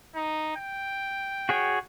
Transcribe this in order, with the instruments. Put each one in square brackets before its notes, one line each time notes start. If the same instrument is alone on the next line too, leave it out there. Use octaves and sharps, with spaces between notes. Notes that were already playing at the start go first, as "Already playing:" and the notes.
[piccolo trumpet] D#4
G5
[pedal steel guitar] F#4 G#4 C#5